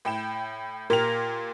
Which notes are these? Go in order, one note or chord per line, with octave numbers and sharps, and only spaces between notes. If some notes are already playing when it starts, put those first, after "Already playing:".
A2 G5 E7
A#2 G4 A#4 F7